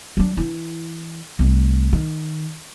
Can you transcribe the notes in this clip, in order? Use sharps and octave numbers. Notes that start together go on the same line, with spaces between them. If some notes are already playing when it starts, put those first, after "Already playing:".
F#3 D4
E3 E4
C2 A3
D#3